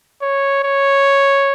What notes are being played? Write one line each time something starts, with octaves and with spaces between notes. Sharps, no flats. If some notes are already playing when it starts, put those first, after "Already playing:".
C#5
C#5